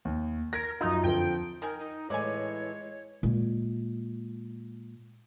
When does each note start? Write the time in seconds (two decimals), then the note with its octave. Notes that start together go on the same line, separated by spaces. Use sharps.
0.05 D#2
0.53 A#4 G#6 A#6
0.81 F#2 D#4 F4
1.04 F2 D3 F3 G5
1.62 D#3 A#4 G#5
1.79 D#4
2.10 A2 E3 G#3 C#5 D5 G#5
3.23 A#2 G#3